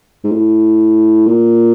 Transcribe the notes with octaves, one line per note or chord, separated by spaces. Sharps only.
G#2
A2
A#2